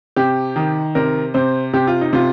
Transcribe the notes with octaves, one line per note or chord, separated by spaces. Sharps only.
C3 G4
D#3
C3 A#4
C3 C5
C3 G4
F4
D#4
C3 F4